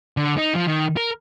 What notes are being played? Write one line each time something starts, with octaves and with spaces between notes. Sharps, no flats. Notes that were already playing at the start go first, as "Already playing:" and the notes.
D3
D#4
F3
D#3
A#4